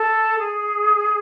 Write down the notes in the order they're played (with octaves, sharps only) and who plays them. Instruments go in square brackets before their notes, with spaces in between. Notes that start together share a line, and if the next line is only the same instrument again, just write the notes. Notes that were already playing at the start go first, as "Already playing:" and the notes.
Already playing: [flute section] A4
G#4